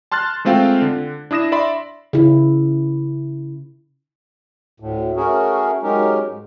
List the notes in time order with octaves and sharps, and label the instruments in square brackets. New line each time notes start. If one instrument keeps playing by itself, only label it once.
[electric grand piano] A5 C6 F6 F#6 A6
G#3 A3 C4 F4 F5 G5
D3
D4 E4 D#6 A#6 E7
D5 E5 B5 C6
[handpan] C#3 E4
[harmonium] D2 A2
A3 C#4 F#4 G#4 A#4
F#3 G#3 C#4 D#4 G4 A#4
G#2